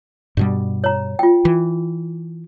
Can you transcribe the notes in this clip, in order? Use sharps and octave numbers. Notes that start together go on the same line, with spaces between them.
G2 B2 G3
C#5 A#5
F4 G5
E3